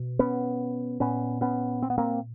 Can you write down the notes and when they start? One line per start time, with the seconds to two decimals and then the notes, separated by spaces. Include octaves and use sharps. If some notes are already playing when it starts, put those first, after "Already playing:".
Already playing: B2
0.19 B3 C#4
1.00 A#2 B3 C#4
1.41 B3 C#4
1.82 C4
1.90 B3
1.98 A#3 C4